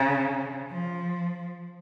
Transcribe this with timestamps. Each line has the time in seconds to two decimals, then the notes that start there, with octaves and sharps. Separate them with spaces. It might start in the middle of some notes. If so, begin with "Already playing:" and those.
Already playing: C#3
0.71 F3